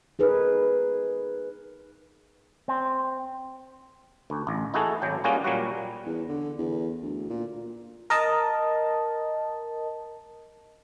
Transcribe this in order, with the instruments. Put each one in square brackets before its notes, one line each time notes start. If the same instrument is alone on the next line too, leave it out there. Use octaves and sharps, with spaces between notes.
[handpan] D#4 G#4 A#4 B4
[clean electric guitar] C4
[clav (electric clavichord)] D2
A1
D#4 E4 F#4 G#4 A4 A5
G#1 F#3 G5
G3 A#3 C#4 F4 F#4 G#4
A#2 F#3 G3 F#4
[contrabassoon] E2
D3
E2
D2
A#2
[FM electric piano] A#4 D#5 A5